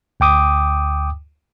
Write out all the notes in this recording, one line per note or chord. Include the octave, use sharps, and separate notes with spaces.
D2 G5 D6 D#6